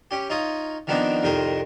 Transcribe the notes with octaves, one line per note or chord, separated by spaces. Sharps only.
C#4 G4
D#4 F4 C#5 D#6
D#3 F3 B3 C4 D4 D#4
C2 F2 D#3 A#4 C5 D#6